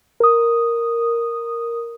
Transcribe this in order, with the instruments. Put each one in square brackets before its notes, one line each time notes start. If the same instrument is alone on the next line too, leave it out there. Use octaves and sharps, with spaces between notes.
[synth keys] A#4 D#6